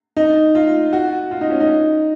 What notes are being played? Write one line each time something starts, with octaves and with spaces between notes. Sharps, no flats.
D#4
F4
F#4
F4
D#4
C#4
D#4